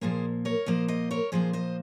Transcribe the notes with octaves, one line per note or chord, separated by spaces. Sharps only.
A#2 F3 A#3 G#4 C5
A#4 C#5
A#2 F3 A#3 C5 D#5
C5 D#5
A#4 C#5
A#2 F3 A#3 G#4 C5
C5 D#5